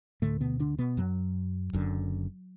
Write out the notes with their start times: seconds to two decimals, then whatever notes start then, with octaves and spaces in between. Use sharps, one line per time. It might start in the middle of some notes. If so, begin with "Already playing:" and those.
0.22 D2 A2 D3 A3
0.41 B2 B3
0.60 D3 D4
0.78 B2 B3
0.97 F#2 F#3
1.73 F#1 F#2 D3